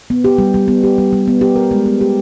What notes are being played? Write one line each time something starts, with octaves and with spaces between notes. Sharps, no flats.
B3
G4
G3
G3
B3
G4
G3
G3
B3
G4
A#4
G#3
B3
G4